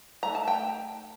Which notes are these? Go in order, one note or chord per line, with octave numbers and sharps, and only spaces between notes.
A3 D#4 A#5
A5
G5